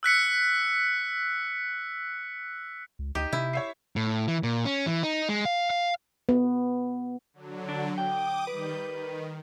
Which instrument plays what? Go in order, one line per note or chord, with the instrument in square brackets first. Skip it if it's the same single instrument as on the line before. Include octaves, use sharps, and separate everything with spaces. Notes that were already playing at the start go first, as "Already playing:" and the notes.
[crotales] E6 F#6 B6 C#7
[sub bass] C#2
[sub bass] D2 [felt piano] D#4 [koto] G4
[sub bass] C3 [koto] E4
[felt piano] C#5 E5 C7
[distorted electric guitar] A2
E3
A#2
C#4
E3
D#4
G#3
F5
F5
[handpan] B3
[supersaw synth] D3 F#3
[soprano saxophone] D4
[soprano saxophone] G5 [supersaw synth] D6 D#6
[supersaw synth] D#3 G3 G6 [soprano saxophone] B4
[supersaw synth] D#3